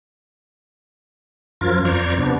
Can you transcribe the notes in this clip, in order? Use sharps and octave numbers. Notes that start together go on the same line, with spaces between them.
F#2 F3 F4 A#4 G#6 A6
F2 C5 D5 A#5 C#6 G#6
C3 B3 D4